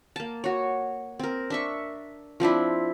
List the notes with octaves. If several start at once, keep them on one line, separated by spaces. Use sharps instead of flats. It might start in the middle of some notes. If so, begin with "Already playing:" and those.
A#3 A5
F#4 C#5
C4 A#4
D4 E5 C#6
F3 C4 D4 E4